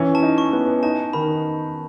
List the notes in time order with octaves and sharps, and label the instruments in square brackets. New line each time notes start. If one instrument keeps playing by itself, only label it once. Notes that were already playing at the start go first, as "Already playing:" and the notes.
Already playing: [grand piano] E3 C#4
[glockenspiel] A5
[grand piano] D#4
[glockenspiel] C#6
[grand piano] B3
[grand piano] D#4 [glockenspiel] A5
[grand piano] D#3 [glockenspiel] B5